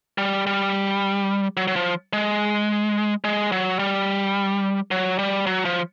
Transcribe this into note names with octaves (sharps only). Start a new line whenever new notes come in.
G3
G3
F#3
F#3
F3
G#3
G#3
F#3
G3
F#3
G3
F#3
F3